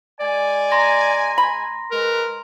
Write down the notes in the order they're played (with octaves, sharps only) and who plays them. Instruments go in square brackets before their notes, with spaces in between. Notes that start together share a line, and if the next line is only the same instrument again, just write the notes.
[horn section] G#3 G#5 [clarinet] D5
[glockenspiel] A#5 C6 A#6
[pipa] B5
[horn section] G#3 B4 [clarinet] A#4